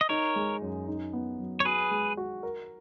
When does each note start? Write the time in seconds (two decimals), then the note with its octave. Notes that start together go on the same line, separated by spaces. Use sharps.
0.01 D#5
0.09 D#4 A#4 C#5
0.36 G#3
0.62 F#2
0.88 D#4
1.13 B3
1.39 F#3
1.60 C#5
1.65 F#4 G#4 B4
1.91 G#3
2.17 F#4
2.43 A#4